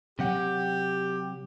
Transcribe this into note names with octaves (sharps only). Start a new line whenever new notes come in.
C3 F#3 G4 F#5